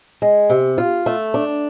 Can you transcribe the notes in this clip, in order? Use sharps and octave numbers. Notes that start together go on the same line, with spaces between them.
G#3
C3
F4
A3
D4